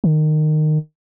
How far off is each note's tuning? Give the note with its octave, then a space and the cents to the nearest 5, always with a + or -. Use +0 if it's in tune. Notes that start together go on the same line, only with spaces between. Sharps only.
D#3 -20